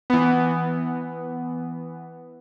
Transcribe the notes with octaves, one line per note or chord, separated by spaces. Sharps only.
E3 B3